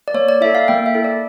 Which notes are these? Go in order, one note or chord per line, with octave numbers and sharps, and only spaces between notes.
D5
A#3 C#5
D5
E4 A4 E5
F5
A#3 G5
E5
E4 A4
D5